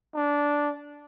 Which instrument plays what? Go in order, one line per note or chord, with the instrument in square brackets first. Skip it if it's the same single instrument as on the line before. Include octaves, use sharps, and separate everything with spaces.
[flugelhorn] D4